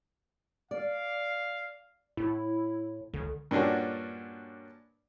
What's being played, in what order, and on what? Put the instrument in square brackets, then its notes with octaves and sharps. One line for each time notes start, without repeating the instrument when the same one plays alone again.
[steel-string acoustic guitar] D5 [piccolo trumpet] F5
[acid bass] A2 [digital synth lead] E4
[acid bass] C#2 [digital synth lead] D3
[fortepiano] G2 A#2 C#4 D4 F#4